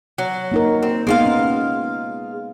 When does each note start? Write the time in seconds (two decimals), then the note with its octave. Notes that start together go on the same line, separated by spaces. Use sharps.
0.18 F#3
0.52 A#3 D#4 A#4
0.83 C4
1.07 G#3 A#3 B3 D#4 F4 F5
1.26 C#4